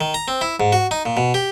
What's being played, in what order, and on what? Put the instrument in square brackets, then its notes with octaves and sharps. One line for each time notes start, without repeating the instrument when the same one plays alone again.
[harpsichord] D#3
A#5
C4
E4
G#2
F#4
D#4
A#2
B2
G4